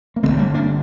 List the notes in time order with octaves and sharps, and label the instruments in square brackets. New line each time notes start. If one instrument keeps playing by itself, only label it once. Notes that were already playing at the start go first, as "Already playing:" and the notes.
[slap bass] A#3
F2 D3 A3 C4
G1
G3 A#3
A#3 D4